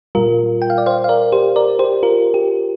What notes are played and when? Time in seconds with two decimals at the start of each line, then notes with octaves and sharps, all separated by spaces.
0.15 A#2 G3 F4 A#4
0.62 G5
0.70 F5
0.78 D5
0.86 C5 F5
1.04 F5
1.09 A#4 D5
1.32 G4 C5
1.56 A#4 D5
1.79 G4 C5
2.03 F4 A#4
2.34 G4